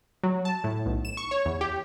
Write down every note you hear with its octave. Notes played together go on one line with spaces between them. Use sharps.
F#3
A5
A2
B1
E7
C#6
C#5
E2
G4